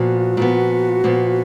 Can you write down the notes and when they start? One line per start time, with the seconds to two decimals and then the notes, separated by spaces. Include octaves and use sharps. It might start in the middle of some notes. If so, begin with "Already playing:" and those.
Already playing: A#2 F3 B3 F#4
0.37 A#2 F3 B3
1.04 A#2 F3 B3